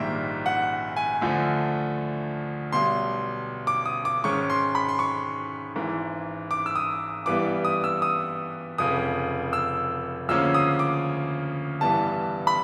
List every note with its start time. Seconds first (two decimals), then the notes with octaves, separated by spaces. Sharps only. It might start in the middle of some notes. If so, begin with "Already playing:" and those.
Already playing: A#1 G#2 D#3 G3 A#3 E5
0.46 F#5
0.96 G#5
1.21 D2 D3 F3 A3
2.72 B1 B2 G3 C6
3.67 D6
3.86 D#6
4.05 D6
4.24 G#2 D#3 G#3 C#4 C#6
4.50 C6
4.75 B5
4.88 C6
4.99 C#6
5.76 G#1 G#2 E3
6.51 D6
6.66 E6
6.76 D#6
7.26 G2 E3 G3 B3 D6
7.65 D#6
7.84 E6
8.02 D#6
8.78 F1 F2 C#3 D#6
9.53 E6
10.29 D2 C#3 F3 A#3 C#4 E6
10.54 D#6
10.79 D6
11.81 G2 E3 G3 B3 A5
12.47 B5